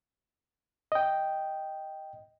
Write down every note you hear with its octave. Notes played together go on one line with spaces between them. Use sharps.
D#5 G5